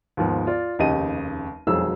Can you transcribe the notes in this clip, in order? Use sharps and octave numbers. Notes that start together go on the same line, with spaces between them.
D#2 G#2 F3 B3
F4 D5
F1 D#2 C#3 G4 D#5 D#7
E1 B1 F2 F#3 G#4 E6